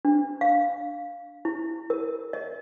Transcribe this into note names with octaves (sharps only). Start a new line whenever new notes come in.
D4
F5
E4
A#4
D#5